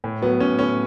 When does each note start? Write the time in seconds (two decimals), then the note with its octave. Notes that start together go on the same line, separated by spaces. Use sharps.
0.04 A2
0.22 F#3 B3
0.40 A2 C#4
0.59 A2 C#4